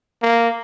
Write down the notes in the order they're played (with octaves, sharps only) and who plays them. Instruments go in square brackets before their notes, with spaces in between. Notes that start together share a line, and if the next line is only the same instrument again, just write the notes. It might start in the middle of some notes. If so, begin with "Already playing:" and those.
[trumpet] A#3